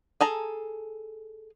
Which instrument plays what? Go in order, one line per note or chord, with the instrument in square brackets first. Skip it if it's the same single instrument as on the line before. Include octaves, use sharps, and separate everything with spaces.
[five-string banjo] G#4 A4 A#5